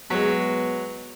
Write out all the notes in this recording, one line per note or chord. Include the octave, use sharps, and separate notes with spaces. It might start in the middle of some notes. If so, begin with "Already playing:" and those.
F#3 G#3 B3